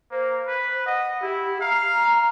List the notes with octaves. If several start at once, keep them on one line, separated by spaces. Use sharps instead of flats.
A#3 C5
B4
D#5 F#5
E4 G4
F5 A#5